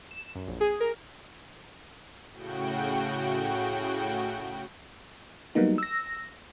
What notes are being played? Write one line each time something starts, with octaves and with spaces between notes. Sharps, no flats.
E7
F#2
A#1
G#4
A#4
A2 C#3 F#4 G5
F#3 G3 A#3 B3 D#4
E6 A#6